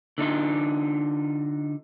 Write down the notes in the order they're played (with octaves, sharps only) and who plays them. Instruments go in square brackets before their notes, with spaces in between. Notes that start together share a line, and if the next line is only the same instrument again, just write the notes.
[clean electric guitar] D3 D4 D#4 F4